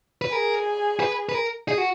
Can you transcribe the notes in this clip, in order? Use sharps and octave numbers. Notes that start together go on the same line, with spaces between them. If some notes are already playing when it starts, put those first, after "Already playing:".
B4
G#4 A#4
B4
B4
A#4
G#4
F#4